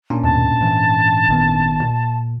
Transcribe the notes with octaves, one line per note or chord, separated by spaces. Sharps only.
A#2 C#4 D4
D#2 G#2 B2 A5
G#2 E3
G#1 D#3 B3
A#2